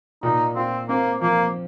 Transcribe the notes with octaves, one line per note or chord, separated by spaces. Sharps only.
A#2 D#4
C4 F4
A#3 C4
F3 A#3